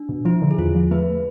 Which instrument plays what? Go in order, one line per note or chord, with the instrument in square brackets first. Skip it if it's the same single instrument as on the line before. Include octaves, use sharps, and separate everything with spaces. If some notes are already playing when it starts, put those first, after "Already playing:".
Already playing: [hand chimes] D4
[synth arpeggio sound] B2
[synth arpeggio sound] F3 [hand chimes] E4
[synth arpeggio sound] D3
[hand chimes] G#4
[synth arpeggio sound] E2 [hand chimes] F4
[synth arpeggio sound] F3
[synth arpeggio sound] A3 [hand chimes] B4